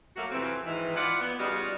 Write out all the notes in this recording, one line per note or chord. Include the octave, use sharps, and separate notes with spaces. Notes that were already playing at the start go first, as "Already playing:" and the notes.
F#3 A3 A#3 F#4
F2 C3 E3 C4
G#2 D#3 E3
E4 F4 D5 F#5
B3
C#3 G3 D#4 F4 F#4